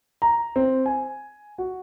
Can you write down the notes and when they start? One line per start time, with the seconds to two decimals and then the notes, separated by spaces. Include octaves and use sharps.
0.22 A#5
0.56 C4
0.86 G#5
1.58 F#4